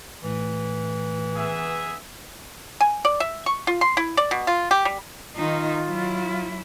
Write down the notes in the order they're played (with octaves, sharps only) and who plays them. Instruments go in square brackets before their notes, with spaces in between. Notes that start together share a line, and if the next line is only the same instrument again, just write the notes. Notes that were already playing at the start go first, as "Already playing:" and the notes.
[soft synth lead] A2 [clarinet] E3
[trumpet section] B3 G#4 E5
[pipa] G#5
D5
E5
C#6
F4
C6
E4
D5
B2
F4
G4
G3
[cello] D#3 D#4 [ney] F4
[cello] F#3 E4